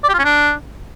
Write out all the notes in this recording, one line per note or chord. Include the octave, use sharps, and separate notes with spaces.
D5
G4
F4
C#4
D4